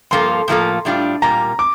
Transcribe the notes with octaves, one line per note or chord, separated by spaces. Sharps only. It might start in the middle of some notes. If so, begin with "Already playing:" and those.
G2 F3 A#3 F4 A4 C6
A2 F3 A#3 F4 A4
A2 G3 D4 F4
A#2 G3 A#3 F4 A#5
D6